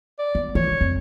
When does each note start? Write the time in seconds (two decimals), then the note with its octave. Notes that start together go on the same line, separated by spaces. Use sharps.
0.19 D5
0.35 B3
0.55 E3 C#5
0.68 D3
0.81 F2 C4